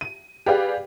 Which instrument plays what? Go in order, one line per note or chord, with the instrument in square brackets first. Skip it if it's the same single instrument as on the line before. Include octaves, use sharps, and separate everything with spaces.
[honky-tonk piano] D#7
G4 G#4 B4 D5 F5 G5